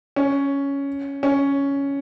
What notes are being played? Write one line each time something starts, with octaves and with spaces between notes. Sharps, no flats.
C#4
C#4